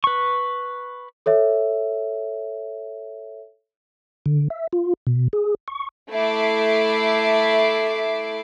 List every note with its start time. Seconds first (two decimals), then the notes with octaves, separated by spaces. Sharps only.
0.04 B4 C#6
1.26 A4 C#5 E5
4.26 D3
4.50 E5
4.73 F4
5.07 B2
5.33 G#4
5.68 C#6
6.10 A3 E4 E5 D6 C7